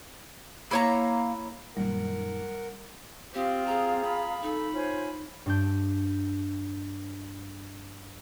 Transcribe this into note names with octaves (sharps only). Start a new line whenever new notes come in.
A#3 E4 C#5 A#5
F#2 A#2 D#3 G3 A#4 F#5
C4 F4 G4 F5 D#6
G#4 A#5
B5
D#4 A4
F4 C5 C#5 G#5
G2 D4 G6